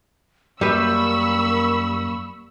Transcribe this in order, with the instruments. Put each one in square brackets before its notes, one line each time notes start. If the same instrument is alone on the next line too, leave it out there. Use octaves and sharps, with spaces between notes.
[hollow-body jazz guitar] F#2 B4 [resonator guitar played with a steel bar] G3 [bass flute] A#3 [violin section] B5 C#6 E6